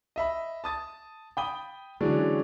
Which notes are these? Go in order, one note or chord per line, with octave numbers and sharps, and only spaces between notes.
D#5 E5 B5
A5 D#6 A6
G5 B5 D#6 G7
D3 E3 F#3 G#3 C#4 D4